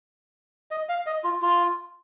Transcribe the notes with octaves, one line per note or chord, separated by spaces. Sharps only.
D#5
F5
D#5
F4
F4